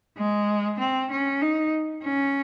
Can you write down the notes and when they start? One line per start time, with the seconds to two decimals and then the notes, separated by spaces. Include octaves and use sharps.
0.17 G#3
0.79 C4
1.11 C#4
1.41 D#4
2.03 C#4